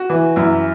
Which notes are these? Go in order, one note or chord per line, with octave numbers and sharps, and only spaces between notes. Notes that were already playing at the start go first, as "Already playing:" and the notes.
Already playing: F#4
E3
F#2 E4